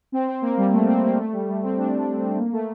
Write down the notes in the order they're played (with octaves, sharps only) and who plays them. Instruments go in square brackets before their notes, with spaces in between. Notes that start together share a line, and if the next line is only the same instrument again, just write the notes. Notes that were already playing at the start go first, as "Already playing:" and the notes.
[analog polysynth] C4
C4
A#3
G3
A3
C4
A#3
A3
G3
G3
C4
D4
D4
C4
A#3
A3